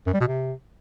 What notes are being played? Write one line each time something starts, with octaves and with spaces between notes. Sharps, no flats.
F#2
G3
B2
C3